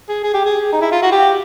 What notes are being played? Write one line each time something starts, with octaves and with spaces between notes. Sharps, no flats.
G#4
G#4
G4
G#4
D#4
E4
F4
F#4
G4